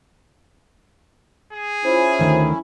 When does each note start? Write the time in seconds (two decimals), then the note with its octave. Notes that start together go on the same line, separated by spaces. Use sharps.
1.53 G#4
1.85 C#4 E4 F4 C5
2.19 D2 D#3